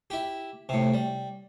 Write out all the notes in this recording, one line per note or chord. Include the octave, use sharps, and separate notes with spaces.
E4 G4
A2 C3
G3